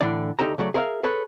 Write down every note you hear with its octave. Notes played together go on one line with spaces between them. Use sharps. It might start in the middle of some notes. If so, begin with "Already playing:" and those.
A2 D3 E3 D4 D5
D2 D#4 G4 A4 A#5
C#3 F#3 A3 D5
G#4 A#4 C#5 E5 F5
G#4 A4 B4 C#5